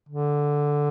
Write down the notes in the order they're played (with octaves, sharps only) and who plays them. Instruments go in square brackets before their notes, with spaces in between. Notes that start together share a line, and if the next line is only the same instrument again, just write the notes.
[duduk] D3